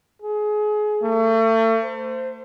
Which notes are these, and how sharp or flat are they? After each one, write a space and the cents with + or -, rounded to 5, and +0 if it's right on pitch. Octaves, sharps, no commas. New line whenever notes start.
G#4 +25
A3 +35
C5 -10